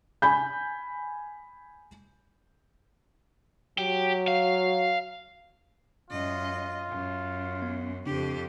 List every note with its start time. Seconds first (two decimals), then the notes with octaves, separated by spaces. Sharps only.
0.22 G#5 B5 G6
3.78 F#3 G4
4.28 F5
6.10 F#2 F4 D#5
6.90 F#2
7.62 B3
8.06 F2 C#3 D4 G4